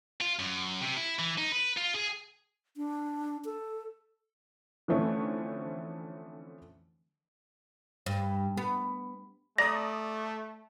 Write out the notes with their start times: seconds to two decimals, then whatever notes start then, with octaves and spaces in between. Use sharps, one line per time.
0.21 F4
0.39 F#2
0.81 C3
0.97 E4
1.19 E3
1.38 D#4
1.52 B4
1.78 F4
1.95 G#4
2.77 D4
3.45 A4
4.88 D3 E3 F3 A3 C4 C#4
8.06 G2
8.57 B3
9.58 A3 D5 A#5 D#6 A#6